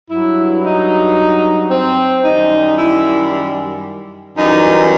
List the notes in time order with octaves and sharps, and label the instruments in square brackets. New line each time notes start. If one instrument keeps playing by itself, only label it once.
[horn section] G2 F#3 E4
D#4
C4
F#2 D#3 G3 D#4
E4
F#2 E3 G3 D#4